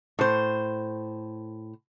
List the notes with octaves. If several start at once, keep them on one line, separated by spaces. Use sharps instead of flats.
A2 C5